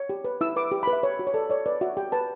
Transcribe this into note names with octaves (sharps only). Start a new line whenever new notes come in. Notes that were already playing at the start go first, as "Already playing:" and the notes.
Already playing: C#5
G4
B4
E4 E6
B4 D6
G4
B5
B4
E5
C#5
F#4
C#5
A4 D5
C#5 D5
B4 D5
F#4 E5
G4 G5
B4 A5